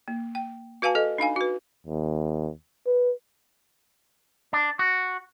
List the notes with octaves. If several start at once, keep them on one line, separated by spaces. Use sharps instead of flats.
A#3
G5
F#4 B4 F5 G#5 A5
A4 D#5
D4 D#4 F5 G#5
F#4 B4
D#2
B4
D4
F#4